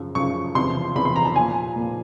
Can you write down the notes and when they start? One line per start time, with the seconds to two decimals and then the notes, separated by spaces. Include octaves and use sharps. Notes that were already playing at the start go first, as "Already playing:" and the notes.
Already playing: F#2 C#3 F3
0.15 F#2 C#3 F3 C#6
0.55 E2 C3 F3 C6
0.95 E2 C3 F3 B5
1.05 C6
1.16 A#5
1.25 A5
1.36 A#2 F3 G#5
1.76 A#2 F3